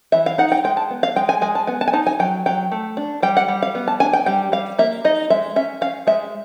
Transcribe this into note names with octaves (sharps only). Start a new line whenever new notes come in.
E3 E5
F5
D#4 F#5
G5
G#3 G5
A5
B3
F5
G#3 G5
G#5
G#3 G#5
A5
B3 G#5
A5
G#5
D#4 A5
G#5
F#3 G5
F#3 G5
A3
D4
G3 G5
F#5
G3
F5
B3
A5
D4 G#5
G5
G3 G5
G3 F5
A#3 E5
D#4 D#5
G#3 E5
C#4 E5
C#4 F5
G#3 E5